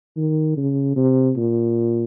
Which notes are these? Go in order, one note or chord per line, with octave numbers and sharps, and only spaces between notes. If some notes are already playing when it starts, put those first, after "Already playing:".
D#3
C#3
C3
A#2